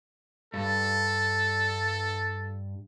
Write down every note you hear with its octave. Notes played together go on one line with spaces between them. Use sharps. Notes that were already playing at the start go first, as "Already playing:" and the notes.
G2 A4